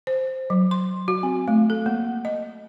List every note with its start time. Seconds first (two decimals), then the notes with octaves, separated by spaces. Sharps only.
0.07 C5
0.50 F#3
0.71 C6
1.08 F#4
1.23 C4
1.48 A3
1.70 A4
1.86 A#3
2.25 D#5